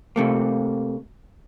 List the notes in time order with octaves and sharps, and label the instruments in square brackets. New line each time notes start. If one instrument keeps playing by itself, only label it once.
[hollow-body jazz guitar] C3 A3 A#3